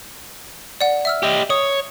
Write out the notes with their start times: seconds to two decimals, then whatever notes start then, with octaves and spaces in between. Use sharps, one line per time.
0.81 D5 F#5
1.05 E5 E6 F6
1.23 G4 D#5
1.50 C#5 D#6